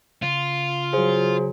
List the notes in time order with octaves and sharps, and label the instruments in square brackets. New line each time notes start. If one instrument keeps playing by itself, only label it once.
[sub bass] C#3 [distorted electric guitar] F4
[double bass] F#3 [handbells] G#4 C5